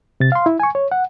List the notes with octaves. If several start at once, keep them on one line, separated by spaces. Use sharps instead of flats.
C3 A6
F5 C6
E4
G#5 C#6
C#5
F#5